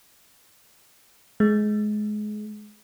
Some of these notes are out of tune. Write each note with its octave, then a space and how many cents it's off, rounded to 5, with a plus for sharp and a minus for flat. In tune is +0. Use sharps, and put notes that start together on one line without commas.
G#3 +25